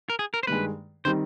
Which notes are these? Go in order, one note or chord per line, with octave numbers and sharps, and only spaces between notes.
A#4
G#4
A#4
C5
G2 D#3 G#3 B4
D#3 G3 C4 D#4 C5